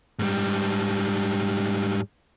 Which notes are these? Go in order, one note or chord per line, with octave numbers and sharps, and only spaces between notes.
G#2 G3